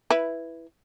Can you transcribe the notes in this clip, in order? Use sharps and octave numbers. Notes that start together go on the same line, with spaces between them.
E4 B4